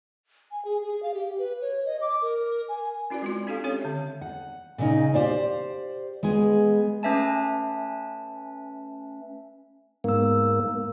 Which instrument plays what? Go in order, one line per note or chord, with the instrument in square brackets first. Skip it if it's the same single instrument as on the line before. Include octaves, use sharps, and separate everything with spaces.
[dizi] G#5
G#4
G#4
F5
G4
B4
C#5
D#5
D6
A#4
G#5
[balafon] C#4 E4 F#4 B4 D5
G#3 C4 F4
C4 D4 G4 A4 F5
C#4 G4 A4 C#5
D3 E5
[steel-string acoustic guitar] F#5
A#2 C#3 D#4
G4 C5 D5 F5
G#3 B3 G#4
[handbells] A3 C#4 B4 E5 G#5 A5
[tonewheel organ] G#2 A#3 [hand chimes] B3 E6